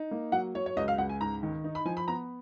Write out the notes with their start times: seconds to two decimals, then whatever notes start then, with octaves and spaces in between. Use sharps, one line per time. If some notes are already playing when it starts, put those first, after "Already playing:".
Already playing: D#4
0.11 A#3
0.32 F#3 F#5
0.55 F#3 C#5
0.66 C#5
0.77 C#2 D#5
0.88 F5
0.98 C#2 F#5
1.09 G#5
1.21 G#2 A#5
1.43 D#3
1.64 D#4
1.75 B5
1.85 F3 G#5
1.97 B5
2.08 B3 A#5